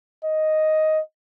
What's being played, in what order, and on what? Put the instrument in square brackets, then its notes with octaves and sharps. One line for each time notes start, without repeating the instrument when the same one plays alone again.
[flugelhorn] D#5